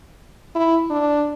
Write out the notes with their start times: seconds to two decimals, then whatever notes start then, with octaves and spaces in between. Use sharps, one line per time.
0.55 E4
0.90 D4